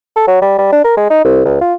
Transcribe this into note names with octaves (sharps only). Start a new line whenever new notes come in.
A4
F#3
G3
G3
D4
A#4
G#3
D#4
C2
C#2
F4